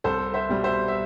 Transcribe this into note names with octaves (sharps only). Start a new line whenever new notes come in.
C2 A4 C5
C5 E5
B2 G3
C5 E5
E5